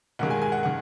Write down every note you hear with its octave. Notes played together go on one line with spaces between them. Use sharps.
E1 D#2 D#3 G#3 F#5
G#5
G#5
F#5
D#3 F#5